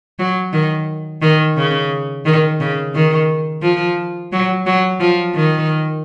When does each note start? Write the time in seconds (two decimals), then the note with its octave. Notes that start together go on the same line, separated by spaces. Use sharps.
0.19 F#3
0.53 D#3
1.22 D#3
1.57 C#3
2.25 D#3
2.60 C#3
2.95 D#3
3.63 F3
4.32 F#3
4.66 F#3
5.00 F3
5.35 D#3